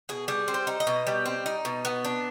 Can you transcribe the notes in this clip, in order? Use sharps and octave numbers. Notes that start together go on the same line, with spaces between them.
B2 G#4
G3 G#4
C4
C5
D#4
D#5
B2
G3
C4
D#4
B2
B3
D4